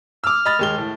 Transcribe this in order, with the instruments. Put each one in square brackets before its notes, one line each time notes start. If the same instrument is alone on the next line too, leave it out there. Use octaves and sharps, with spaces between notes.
[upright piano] D6 E6 [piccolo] F6
[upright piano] D#5 B5 A6
D#2 G#3 G7
A2